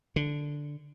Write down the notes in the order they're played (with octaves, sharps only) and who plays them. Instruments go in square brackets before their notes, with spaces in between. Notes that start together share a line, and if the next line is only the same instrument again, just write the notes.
[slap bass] D3